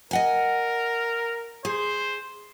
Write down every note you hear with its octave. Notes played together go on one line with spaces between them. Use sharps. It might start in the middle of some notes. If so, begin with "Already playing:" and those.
A#4 D#5 F#5 G#5
G#4 C5